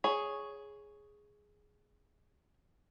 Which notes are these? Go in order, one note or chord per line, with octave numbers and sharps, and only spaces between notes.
G#4 C#5